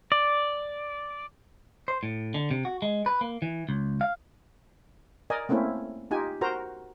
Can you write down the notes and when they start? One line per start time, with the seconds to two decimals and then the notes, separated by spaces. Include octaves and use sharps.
0.12 D5
1.88 C5
2.03 A2
2.34 D3
2.51 C3
2.65 F#4
2.82 G#3
3.06 B4
3.21 A#3
3.42 E3
3.69 C#2
4.01 F5
5.30 A#4 D5 D#5 G#5
5.49 A3 A#3 C4 C#4 E4
6.11 D#4 F4 G4 G#5
6.41 F#4 A#4 C5 A#5